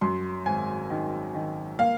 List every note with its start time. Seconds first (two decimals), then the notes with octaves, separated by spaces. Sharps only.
0.01 F#2 C6
0.46 G#1 G#5
0.90 D#3
1.35 D#3
1.79 A#3 F5